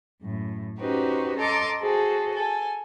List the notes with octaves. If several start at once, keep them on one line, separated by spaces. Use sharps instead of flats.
F#2 A2
C#4 D#4 F#4 G4 B4 C5
A4 D#5 A#5 C6 D6
F#4 G#4 A4 C5
A4 G#5